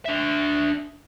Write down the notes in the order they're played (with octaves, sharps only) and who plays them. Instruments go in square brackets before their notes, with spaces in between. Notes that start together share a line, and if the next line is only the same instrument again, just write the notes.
[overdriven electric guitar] D4 E5